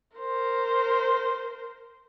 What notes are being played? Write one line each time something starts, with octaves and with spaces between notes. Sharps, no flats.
A#4 C5